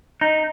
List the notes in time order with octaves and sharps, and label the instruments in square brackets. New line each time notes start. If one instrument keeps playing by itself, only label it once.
[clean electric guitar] D#4